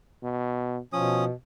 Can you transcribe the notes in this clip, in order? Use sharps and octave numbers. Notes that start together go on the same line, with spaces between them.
B2
B2 F3 C#4 D#6